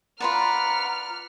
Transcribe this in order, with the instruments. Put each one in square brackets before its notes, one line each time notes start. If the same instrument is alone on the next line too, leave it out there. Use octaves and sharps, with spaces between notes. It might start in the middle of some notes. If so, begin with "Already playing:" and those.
[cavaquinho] F4 B4 D5 [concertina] F#5 [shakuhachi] A#5 [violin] F6